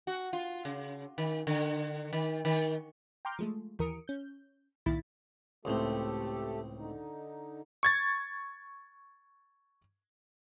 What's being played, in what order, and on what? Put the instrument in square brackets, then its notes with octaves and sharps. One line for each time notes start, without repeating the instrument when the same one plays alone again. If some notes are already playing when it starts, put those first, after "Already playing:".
[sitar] F#4
F4
C#3
D#3
D3
D#3
D#3
[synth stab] G5 A#5 C6 D6 F6 G6
F3 G#3 A3
D#2 E3 A#4 D#6 C#7 D7
C#4 G6
C2 A#2 D#3 E4 B5 A6
[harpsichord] C#2 A2 C4 [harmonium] A3 G4 A4
[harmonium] D3 D#4
[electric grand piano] C#6 G#6 A6